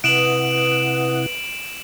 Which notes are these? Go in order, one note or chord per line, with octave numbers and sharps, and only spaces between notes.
C3 E4 B4 F#5 D#6 D7 E7 F#7